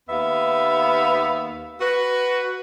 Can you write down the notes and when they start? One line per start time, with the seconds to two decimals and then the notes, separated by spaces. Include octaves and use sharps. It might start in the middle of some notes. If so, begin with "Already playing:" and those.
0.08 D#2 B3 E5 F5
1.80 F#4 B4